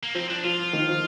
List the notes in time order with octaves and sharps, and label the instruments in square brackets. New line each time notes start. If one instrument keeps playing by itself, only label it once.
[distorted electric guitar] A#3
[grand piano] F3 [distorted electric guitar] C4
[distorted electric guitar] D4
[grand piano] F3 [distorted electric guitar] F4
[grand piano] D#3
F3